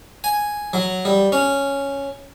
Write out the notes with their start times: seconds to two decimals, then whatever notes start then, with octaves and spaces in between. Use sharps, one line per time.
0.24 G#5
0.73 F#3
1.05 G3
1.32 C#4